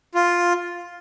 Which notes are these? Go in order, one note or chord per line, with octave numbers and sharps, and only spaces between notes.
F4